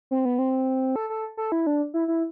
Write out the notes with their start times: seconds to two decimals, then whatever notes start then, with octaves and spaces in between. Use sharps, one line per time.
0.11 C4
0.25 B3
0.39 C4
0.96 A4
1.10 A4
1.37 A4
1.52 E4
1.67 D4
1.94 E4
2.08 E4